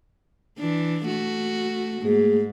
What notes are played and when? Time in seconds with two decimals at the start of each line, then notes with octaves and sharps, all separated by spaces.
0.59 E3 D4
1.06 A3 F#4
2.02 G#2 A3 A#3 G#4